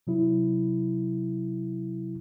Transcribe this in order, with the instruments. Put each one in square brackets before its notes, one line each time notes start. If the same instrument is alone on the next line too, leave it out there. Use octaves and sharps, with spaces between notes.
[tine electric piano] C3 F#3 E4